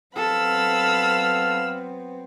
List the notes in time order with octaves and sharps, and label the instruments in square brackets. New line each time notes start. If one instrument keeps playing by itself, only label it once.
[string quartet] F#3 B3 C4 [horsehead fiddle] A4 [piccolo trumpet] F5 [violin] B5 E6